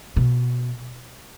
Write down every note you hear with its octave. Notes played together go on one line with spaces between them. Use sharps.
B2